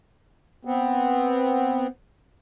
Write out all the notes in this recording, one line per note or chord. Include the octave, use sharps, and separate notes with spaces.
B3 C4